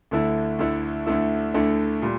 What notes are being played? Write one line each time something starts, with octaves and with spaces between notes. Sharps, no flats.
D2 D3 A3 E4
D2 D3 A3 E4
D2 D3 A3 E4
D2 D3 A3 E4
A#2 G3